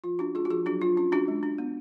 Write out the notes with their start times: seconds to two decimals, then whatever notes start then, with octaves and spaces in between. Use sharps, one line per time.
0.04 F3 F4
0.19 C#4 D4 F#4
0.34 G#3 F4 G#4
0.45 F#4
0.50 F3 F4 G#4
0.66 F#3 D4 F#4
0.81 F#3 F4
0.97 C#4 F4
1.12 C#4 D4 F#4
1.28 G#3
1.43 D4
1.58 B3